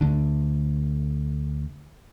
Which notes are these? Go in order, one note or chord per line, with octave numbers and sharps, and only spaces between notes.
D2 D3